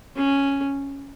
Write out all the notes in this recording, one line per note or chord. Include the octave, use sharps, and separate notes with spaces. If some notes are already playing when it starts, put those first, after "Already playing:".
C#4